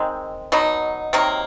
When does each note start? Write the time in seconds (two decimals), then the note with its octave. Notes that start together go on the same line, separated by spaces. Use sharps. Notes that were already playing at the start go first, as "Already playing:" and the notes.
Already playing: D#3 G#3 C4
0.52 B2 F#3 B3 D#4
1.13 C3 D#3 F#3 A#3